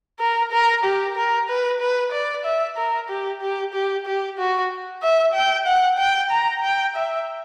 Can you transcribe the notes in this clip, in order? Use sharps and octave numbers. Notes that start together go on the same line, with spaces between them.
A#4
A#4
G4
A#4
B4
B4
D5
E5
A#4
G4
G4
G4
G4
F#4
E5
G5
F#5
G5
A#5
G5
E5